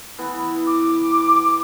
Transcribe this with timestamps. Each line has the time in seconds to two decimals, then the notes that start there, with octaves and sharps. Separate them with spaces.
0.18 E3 B3
0.67 D6